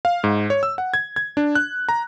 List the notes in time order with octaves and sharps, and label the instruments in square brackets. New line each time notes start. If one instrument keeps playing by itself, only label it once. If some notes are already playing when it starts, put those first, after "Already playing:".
[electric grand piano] F5
G#2
C#5
E6
F#5
G#6
G#6
D4
F#6
A#5